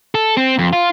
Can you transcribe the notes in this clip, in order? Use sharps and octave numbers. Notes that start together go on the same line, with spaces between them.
A4
C4
F2
F4